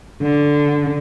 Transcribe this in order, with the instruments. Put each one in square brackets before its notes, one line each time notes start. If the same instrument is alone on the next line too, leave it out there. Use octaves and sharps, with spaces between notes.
[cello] D3